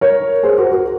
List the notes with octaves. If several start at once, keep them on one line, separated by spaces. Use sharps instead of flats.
A#4 C#5
G#4 C5
F#4 A#4
F#4 A#4